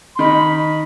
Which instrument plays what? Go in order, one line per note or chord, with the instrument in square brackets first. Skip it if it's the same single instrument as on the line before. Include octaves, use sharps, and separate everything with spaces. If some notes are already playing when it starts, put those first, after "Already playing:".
[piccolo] C6
[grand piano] D#3 D#4 [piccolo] B5